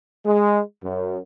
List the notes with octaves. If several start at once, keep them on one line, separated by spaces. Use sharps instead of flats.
G#3
F#2